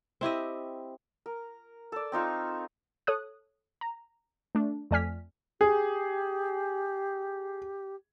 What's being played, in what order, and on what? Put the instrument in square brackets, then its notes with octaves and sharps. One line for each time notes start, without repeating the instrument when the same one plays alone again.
[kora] C4 E4 G4 D#5
[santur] A#4
A4 D5
C4 D#4 F4 C#6
[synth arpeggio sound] A4 C#5 D#6 F#6
A#5
A3 D4
F2 A3 D5 G#5 F6 B6
[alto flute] G4 [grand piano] G#4